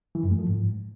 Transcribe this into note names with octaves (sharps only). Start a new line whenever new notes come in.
E3
F#2
A3
F3
G#2